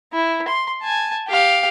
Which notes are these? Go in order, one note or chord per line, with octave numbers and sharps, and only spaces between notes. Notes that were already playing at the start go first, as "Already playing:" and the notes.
E4
C6
G#5 A5
G4 F5